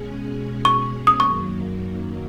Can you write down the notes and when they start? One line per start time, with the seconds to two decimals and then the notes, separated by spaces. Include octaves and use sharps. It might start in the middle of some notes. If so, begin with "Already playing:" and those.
Already playing: B2 G#3 C#4 G#4
0.65 C#6
1.07 D#6
1.19 F#2 D#3 F#3 A#3 C#6